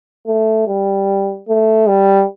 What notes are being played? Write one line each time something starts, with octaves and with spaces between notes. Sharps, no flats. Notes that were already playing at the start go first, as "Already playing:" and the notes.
A3
G3
A3
G3